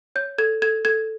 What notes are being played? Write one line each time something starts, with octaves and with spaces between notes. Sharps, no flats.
C#5 G6
A4 G#6
A4 G#6
A4 G#6